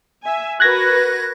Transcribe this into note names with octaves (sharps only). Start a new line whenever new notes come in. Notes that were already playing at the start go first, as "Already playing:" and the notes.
E5 G#5
F#4 A#4 B4 F#6 G#6 A#6